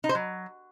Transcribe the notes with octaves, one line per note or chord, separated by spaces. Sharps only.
D#4
C5
F#3